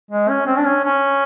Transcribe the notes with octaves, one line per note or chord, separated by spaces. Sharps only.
G#3
C#4
C4
D4
C#4
C#4